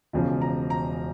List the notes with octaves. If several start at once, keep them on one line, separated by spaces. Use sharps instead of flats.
E1 E2 C#3 F3
A#5
A#5